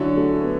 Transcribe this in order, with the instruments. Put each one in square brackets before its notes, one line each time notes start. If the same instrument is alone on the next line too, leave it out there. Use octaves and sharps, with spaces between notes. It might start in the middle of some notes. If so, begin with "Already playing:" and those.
Already playing: [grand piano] D3 F#3 C#4 E4 [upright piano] D4 F#4
[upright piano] A3
B3